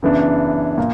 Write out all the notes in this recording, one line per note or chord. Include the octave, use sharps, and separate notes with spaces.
F#2 C#3 E3 B3 D4
A#2 A#3